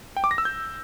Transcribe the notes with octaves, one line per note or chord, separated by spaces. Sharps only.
G5
D6
A#6
E6
G6